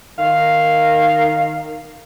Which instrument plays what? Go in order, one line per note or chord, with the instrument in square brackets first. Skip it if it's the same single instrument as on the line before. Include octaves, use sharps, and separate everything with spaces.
[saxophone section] D#3 F5